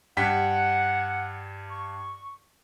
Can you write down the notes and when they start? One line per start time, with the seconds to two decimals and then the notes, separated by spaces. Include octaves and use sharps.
0.17 G2 F#5 G5 B6
1.70 C#6